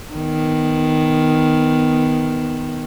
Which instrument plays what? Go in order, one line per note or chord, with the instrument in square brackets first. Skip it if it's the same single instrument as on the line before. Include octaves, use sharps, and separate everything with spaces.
[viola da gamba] D#3 B3